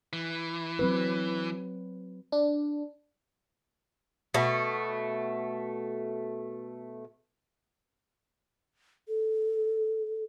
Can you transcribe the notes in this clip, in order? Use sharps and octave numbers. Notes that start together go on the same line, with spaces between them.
E3
F#3 C4 B4
D4
B2 A3
A4